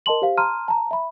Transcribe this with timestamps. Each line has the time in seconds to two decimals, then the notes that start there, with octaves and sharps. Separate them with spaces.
0.06 A#4 D#5 A5 C6 F#7
0.22 G4 C5 F5
0.37 A5 A#5 C6 F6 D#7
0.68 A5 A#5
0.91 E5 B5